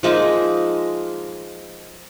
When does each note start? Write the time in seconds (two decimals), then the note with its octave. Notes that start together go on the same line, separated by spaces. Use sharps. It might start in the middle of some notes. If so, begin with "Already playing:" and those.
0.03 F3 G#3 A#3 D#4